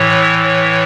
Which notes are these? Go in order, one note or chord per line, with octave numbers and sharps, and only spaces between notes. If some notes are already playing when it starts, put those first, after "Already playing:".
Already playing: A2 E3 C#5
C#5